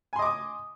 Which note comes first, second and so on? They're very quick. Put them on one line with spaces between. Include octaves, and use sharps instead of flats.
G#5 C6 D#5 D6 D#6